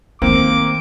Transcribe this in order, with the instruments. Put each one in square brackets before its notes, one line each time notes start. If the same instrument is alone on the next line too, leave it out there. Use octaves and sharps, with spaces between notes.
[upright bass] D#3 A3 [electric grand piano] A#3 C4 [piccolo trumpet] D6